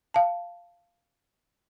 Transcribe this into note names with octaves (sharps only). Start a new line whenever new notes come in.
F5 A5